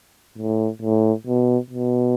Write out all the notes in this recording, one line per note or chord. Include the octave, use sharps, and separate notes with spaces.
A2
A2
B2
B2